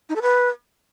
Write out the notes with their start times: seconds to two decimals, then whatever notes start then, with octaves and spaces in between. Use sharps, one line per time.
0.09 D#4
0.16 A4
0.22 B4